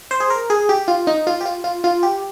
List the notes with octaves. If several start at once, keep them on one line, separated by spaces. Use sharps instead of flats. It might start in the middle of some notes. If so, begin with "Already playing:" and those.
C5
G#4
A#4
G#4
G4
F4
D#4
F4
G4
F4
F4
F4
G4